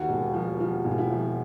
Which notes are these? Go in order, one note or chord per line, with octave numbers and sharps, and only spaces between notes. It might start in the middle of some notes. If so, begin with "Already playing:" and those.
Already playing: D#2 F#4
E1
F3
F3 F4
E1
F4
E4
F3